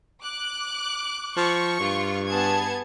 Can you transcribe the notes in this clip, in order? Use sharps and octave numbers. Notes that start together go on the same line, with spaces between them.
D6 F#6
F3 C#6
G2 F4
B3 G#4 A5 G#6